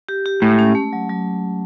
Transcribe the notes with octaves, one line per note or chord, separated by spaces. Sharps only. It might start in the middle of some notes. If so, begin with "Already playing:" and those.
G4
G4
A2 G#3
C#4
A3
F#3
F#3